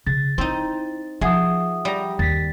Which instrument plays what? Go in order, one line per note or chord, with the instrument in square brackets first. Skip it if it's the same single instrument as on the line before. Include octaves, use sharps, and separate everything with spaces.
[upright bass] C#3 [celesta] A6
[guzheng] C4 D#4 [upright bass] E4
[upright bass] F3 [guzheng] G#4 [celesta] E5 F#5 D#6
[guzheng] G3 A#5
[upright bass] D#2 [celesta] A6 B6